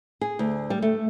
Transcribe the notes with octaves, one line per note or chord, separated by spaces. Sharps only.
G#4
D2
G3
A3